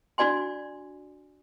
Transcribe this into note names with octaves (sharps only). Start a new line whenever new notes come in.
D4 F#4 D5 G#5 C6